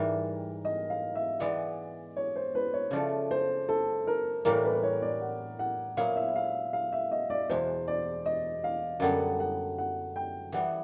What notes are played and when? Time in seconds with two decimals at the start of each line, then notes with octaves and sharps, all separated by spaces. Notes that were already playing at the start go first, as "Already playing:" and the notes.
Already playing: G#2 E3 G3 A#4
0.65 D#5
0.90 F5
1.15 E5
1.40 E3 G#3 B3 D5
2.17 C#5
2.36 C5
2.55 B4
2.74 C#5
2.91 C#3 F3 A3 D5
3.31 C5
3.69 A4
4.07 A#4
4.45 A2 E3 G3 A#3 A#4
4.64 B4
4.83 C#5
5.02 D5
5.22 F#5
5.59 F#5
5.97 A#2 F#3 B3 E4 F5
6.16 E5
6.36 F5
6.73 F5
6.92 E5
7.12 D#5
7.30 D5
7.49 E2 B2 G#3 C5
7.88 D5
8.26 D#5
8.64 F5
9.00 F#2 D3 G3 B3 F#5
9.40 F#5
9.78 F#5
10.16 G5
10.52 E3 G3 B3 F#5